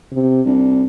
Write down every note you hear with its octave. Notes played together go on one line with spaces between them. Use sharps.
C3
C2 D4